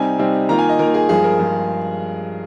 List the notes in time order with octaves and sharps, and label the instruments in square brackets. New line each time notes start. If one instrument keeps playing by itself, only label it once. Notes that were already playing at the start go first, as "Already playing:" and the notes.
Already playing: [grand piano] C3 G3 C4 D#4 G#5
C3 G3 C4 D#4
D#3 A#3 F4 A#5
G#5
D#5
D#3 A#3 F4 A#4
G#4
G2 F3 G#3 G#4
A#4
G2 F3 G#3